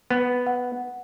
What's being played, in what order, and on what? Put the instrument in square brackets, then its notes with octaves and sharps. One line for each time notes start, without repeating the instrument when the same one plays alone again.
[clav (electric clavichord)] B3
[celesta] F#5